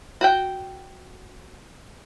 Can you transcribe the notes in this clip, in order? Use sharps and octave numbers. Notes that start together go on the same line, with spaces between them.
F#4 F#5 G5